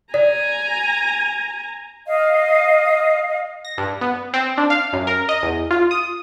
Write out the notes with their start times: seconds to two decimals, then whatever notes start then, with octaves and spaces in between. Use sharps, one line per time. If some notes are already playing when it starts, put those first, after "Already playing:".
0.14 D5 G#5 A#5
2.06 D#5 F5
3.65 A#6
3.78 G2
4.01 B3
4.34 C4
4.58 D4
4.70 F5
4.93 F#2
5.07 A#4
5.29 D#5
5.43 E2
5.71 F4
5.91 D#6